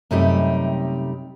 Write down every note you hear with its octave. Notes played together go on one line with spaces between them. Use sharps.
F#2 C3 G3 A3 D#4 G4